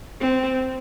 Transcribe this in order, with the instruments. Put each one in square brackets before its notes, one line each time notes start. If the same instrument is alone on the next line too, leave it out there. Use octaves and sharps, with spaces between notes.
[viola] C4